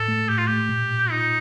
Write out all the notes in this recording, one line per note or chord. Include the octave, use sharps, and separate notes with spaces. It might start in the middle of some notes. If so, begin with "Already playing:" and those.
Already playing: A2 A4
A3
A2 G4
F4
A3 G4
A#2
A#2
D#4 F4